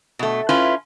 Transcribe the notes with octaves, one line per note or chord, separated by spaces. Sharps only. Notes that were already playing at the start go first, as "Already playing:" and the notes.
B2 A3
C#4 E4 F4 B4